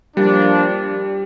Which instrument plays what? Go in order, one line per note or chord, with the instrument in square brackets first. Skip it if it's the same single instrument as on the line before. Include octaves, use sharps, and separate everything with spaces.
[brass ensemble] F3 A#3 D4 [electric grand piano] G3